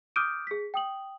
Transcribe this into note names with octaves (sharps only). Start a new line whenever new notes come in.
D6 D#6 F6 G6 D7 D#7
G#4 B6
G5 D#6 F#7